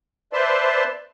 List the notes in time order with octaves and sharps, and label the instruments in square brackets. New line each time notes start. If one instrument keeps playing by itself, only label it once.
[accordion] B4 C5 D5 E5 A5 C6